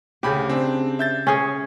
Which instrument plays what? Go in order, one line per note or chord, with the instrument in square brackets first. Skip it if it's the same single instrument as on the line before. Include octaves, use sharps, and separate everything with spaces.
[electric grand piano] D2 B5 [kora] C#3 G4
[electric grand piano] C4 D4
E5 G6 A6
[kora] C#4 G#4 C#5